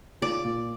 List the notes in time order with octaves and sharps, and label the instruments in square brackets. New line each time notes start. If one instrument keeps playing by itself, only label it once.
[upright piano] F4 [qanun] D5
[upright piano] A#2